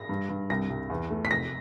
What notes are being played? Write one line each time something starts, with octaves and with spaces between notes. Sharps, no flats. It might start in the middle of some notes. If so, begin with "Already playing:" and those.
Already playing: A#6
G2
G2
C2 A#6
C2
E2
A3
B6
F1 A#6